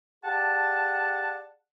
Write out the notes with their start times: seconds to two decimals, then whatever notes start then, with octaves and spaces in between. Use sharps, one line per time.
0.24 G4 G#4 D5 F5 F#5 A5